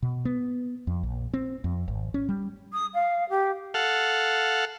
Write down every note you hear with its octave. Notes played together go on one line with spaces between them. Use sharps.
B2
B3
F2
A#1
C4
F2
G#1
C#4
G3
D#6
F5
G4
A4 F5 F#5